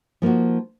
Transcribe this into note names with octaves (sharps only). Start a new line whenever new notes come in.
F3 A#3 D#4 F#4